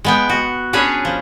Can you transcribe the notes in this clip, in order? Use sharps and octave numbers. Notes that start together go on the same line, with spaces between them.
G#3 B3 G5
F#4
C#4 D4 G#4 B4 C#5
F3